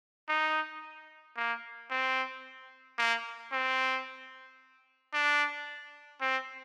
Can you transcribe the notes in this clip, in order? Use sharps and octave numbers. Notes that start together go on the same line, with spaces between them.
D#4
A#3
C4
A#3
C4
D4
C4